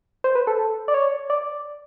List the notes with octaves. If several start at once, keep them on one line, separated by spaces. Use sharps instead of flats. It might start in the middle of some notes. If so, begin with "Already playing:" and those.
C5
B4
A4
D5
C#5
D5